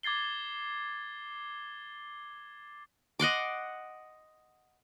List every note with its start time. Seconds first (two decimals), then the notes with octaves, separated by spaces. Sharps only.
0.03 D6 G#6 A6 C7 G7
3.20 D#5 F#5 C6 D6